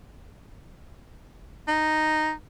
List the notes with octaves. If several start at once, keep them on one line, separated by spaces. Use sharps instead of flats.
D#4